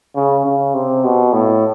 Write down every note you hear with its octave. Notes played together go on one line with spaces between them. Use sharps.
C#3
C#3
C3
B2
A2